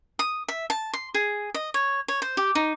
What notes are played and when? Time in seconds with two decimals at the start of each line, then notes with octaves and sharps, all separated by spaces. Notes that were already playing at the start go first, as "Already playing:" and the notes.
0.19 D#6
0.48 E5
0.70 A5
0.93 C6
1.14 G#4
1.54 D#5
1.74 C#5
2.08 C#5
2.22 C5
2.37 G4
2.55 D#4